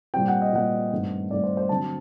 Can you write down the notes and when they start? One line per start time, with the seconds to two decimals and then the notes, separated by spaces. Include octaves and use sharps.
0.14 A#2 G3 C4 G5
0.28 F#5
0.42 D#5
0.53 A#2 G3 C4 F#5
0.92 G2 D#3 A3 C4
1.31 G2 D#3 A3 C4 D5
1.44 C5
1.57 C5
1.69 D3 F#3 C4 A5